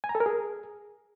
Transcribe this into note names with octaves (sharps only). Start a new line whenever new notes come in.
G#5
A#5
A4
A#4
G#4